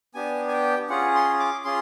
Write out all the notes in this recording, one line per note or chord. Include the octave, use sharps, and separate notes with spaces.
B3 D4 G4 G#5
G#5
G5
C#4 F4 G#4 F#5
C6
D6
C#4 F4 G#4 C6